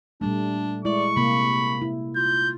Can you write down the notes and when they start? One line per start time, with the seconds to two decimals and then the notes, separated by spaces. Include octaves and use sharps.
0.21 A#2 G3 A3 D4
0.85 G#3 E4 D5 C#6
1.16 C3 A#3 B5
1.82 E4
2.16 F4 G6